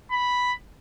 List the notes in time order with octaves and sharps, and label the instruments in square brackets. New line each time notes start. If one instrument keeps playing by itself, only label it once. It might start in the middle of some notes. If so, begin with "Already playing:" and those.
[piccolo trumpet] B5